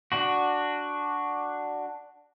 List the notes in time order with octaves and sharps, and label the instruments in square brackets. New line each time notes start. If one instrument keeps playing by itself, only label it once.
[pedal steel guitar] D4 F#4